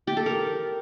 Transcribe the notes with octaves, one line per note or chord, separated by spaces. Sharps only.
G4
A4
A#4